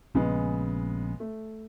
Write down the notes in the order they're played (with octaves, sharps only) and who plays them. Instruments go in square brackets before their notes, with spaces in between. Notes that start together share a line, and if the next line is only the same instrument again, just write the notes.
[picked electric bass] A#1 [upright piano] C#3 G#3 B3
[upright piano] A3